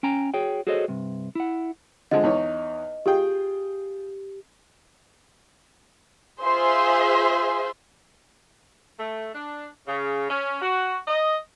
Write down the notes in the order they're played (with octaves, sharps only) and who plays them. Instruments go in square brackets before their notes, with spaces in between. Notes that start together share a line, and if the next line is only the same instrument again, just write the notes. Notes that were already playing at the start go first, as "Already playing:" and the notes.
[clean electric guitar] C#4 G5 G#5 A#5
F#4 G#4 C#5 G5
F#4 G#4 A4 C5 C#5 D#5
G2 C3
E4 F#5
[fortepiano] D3 F3 G#3 [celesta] D#5
[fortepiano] E2 D#4 C#5
[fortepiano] F4 G#4 G5 [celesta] G4
[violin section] F4 G#4 C5 E5 C6
[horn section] A3
D4
C#3
C#4
F#4
D#5